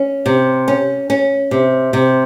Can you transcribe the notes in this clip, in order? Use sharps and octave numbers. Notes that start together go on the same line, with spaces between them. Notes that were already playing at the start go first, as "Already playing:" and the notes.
Already playing: C#4
C3
C#4
C#4
C3
C3